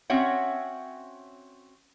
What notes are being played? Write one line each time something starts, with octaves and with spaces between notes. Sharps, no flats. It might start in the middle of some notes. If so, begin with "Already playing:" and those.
C4 C#4 F#4 C#5 E5 F#5